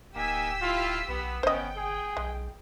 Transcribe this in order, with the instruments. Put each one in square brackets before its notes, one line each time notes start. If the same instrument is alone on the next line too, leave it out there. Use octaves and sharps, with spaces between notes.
[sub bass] D1 [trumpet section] A#3 D#4 G#5 [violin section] G4 E6 B6
[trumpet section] E4 F4
[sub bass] B1 [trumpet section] B3
[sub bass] G1 [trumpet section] B3 C#4 [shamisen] C5 D#5 [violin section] G5
[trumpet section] G#4
[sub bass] B1 [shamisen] G#3